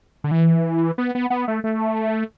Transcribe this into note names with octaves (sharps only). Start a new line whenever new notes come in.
D3
E3
B3
B3
B3
A3
A3